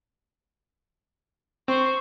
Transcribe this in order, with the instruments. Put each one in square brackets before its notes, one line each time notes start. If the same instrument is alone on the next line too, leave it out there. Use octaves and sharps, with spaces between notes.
[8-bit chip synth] C4 [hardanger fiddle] C5 [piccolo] C#6